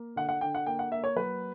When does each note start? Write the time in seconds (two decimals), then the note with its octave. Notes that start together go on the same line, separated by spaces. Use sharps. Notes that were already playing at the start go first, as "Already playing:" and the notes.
Already playing: A#3
0.16 D3 F#5
0.29 F#5
0.41 D3 G5
0.55 F#5
0.66 A#3 G5
0.79 F#5
0.91 A#3 E5
1.04 C#5
1.16 F#3 B4